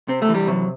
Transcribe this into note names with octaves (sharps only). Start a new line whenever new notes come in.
C3 C4
A3
E3
G3
C3 F#3